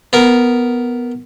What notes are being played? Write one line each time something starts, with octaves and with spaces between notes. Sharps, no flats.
B3 A#4